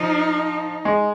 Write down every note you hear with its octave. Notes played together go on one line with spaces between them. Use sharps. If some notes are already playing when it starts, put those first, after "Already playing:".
Already playing: F3 D#4
G#3